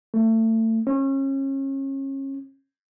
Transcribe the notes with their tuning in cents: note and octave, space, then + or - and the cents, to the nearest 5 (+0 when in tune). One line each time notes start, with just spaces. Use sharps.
A3 +30
C#4 -30